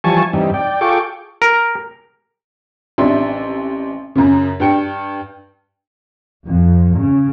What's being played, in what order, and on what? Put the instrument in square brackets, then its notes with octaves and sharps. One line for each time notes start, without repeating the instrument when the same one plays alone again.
[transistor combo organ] E3 F3 G3 G#5 A5 C#6
G2 C3 E3 G3 D#4
D5 G5
F4 G#4 A4 G5 C#6 D6
[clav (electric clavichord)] A#4
[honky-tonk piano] A1 C3 D4 E5 C6
F#2 C#3
G2 G5 C#7
[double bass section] F2
C#3